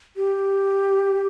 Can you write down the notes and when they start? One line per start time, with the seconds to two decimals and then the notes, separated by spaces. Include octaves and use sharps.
0.16 G4